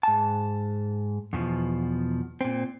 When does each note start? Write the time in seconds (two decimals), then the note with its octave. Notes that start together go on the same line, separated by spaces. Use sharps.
0.03 G#2 A5
1.33 E2 B2 F3
2.41 A#2 C4